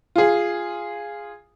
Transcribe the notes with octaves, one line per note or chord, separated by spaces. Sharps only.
F4 G#4